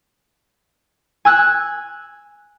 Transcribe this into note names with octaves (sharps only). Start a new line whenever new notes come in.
G#5 E6 F#6